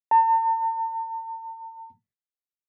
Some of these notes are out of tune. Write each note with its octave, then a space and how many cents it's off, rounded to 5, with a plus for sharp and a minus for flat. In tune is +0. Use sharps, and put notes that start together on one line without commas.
A5 +45